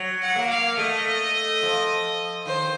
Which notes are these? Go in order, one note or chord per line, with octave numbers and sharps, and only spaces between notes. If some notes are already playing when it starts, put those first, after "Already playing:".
Already playing: F#3
F#5
A#3
F5
A3 D#5
F3
D#3 C5